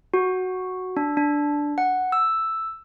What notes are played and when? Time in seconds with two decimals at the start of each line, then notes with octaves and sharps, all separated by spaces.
0.14 F#4
0.97 D4
1.17 D4
1.78 F#5
2.12 E6